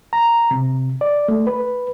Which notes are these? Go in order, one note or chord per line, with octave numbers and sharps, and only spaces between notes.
A#5
C3
D5
A3
B4